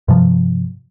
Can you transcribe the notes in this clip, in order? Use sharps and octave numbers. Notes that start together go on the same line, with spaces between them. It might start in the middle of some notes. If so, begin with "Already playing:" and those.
G2 C3 F3